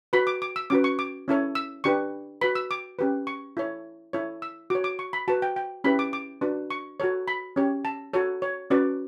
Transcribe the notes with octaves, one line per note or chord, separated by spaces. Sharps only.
F#4 B4 B5
D6
D6
E6
C#4 F#4 B4 D6
C#6
D6
C#4 E4 A4 C#5
E6
D4 G4 B4 C#6
F#4 B4 B5
E6
D6
C#4 G4 B4
C#6
E4 A4 C#5
E4 A4 C#5
E6
F#4 C#5 D6
D6
C#6
B5
F#4 B4 A5
G5
G5
C#4 E4 G4 B4 B5
D6
D6
D4 F#4 B4
C#6
F#4 A4 C#5
B5
C#4 G4 C#5
A5
F#4 A4 C#5
C#5
C#4 F#4 B4 D5